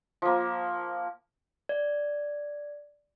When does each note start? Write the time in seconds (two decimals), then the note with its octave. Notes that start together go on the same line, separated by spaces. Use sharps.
0.22 F3 A#3
1.69 D5